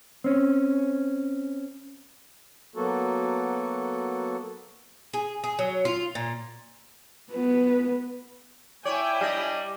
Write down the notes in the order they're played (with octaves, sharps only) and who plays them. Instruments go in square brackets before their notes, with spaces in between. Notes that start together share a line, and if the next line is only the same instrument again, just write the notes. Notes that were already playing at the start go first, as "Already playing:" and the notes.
[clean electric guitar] C4 C#4
[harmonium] F#3 A#3 B3 F#4 A4
[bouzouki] G#4
G#4
F#3
F4
A#2
[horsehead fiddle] B3 B4
[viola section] E4 G5 G#5 [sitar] C#5 [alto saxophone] D5
[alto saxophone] G3 [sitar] D4 D#5